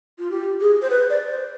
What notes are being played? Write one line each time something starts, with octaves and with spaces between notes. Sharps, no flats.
F4
G4
G#4
C5
B4
D5
C5